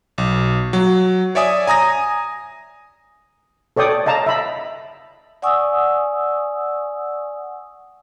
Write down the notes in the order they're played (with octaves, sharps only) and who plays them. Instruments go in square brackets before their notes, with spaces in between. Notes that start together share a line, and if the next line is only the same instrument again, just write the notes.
[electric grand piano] B1
F#3
C#5 D5 E5 G#5 D#6
G#5 A#5 D#6 A#6
[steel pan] A4 C#5 D5 G5 D#6
D#5 F5 A5 A#5
E5 B5
[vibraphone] D5 F#5 G#5 C#6 D#6 E6